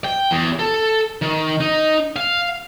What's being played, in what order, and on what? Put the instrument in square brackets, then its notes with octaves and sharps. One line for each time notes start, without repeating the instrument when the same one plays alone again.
[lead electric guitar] G5
E2
A4
D#3
D#4
F5